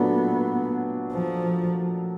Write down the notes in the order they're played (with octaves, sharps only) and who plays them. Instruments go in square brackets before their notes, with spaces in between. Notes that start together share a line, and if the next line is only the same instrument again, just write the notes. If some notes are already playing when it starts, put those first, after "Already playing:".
Already playing: [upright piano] A#2 F#3 A3 D4 [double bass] B3
[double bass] F3